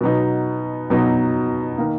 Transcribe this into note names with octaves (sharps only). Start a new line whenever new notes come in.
B2 F#3 B3 D#4
B2 F#3 B3 D#4
D#3 A#3